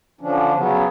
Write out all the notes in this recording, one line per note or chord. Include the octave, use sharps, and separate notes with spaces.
D3 F3 C#4 D4
C#3 F#3 B3 C#4